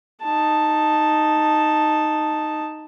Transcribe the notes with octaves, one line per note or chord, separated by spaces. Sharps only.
D#4 A5